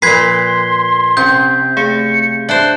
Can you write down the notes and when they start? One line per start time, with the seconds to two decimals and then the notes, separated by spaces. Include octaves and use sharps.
0.02 A#2 F3 B4 C6 G#6 B6 C7
1.17 C3 C#4 G6
1.77 A3 G#4 F5 C#7
2.49 D4 C5 E5 A5 F#6